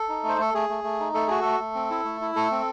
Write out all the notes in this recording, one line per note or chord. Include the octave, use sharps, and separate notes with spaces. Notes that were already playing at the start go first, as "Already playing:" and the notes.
Already playing: A4
D#4
A3
C5
A3 A4
A3 G#4
A3
A3
D#4
A3 A4
F#4 G#4
A3 A4
A3
C4
E4
A3
E4
A3 A4
C4